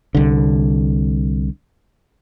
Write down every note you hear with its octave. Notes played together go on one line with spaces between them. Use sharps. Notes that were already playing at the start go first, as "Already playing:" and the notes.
C2 D3